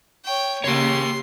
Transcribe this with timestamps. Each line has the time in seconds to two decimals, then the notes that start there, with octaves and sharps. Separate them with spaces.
0.25 C#5 G5
0.64 C#3 A#3 C#4 G4 C#5 C6